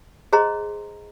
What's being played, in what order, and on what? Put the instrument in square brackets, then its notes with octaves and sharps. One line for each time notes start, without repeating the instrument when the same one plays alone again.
[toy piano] G#4 C5 D#5 A#5 C6